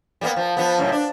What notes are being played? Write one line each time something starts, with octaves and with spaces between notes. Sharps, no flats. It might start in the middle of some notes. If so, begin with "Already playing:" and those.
G3 A#3 B3
F3
F3 B3
F#2 A2 C3
D4